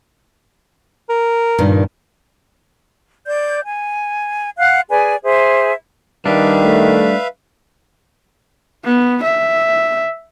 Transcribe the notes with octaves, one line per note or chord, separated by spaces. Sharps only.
A#4
G2 A#2 D#3
D5 G6
G#5
F5 F#5 F#6
G#4 B4 D5 G#5
G#4 C5 E5
D#3 G3 D4 B4 E5 F5
A3
B3
E5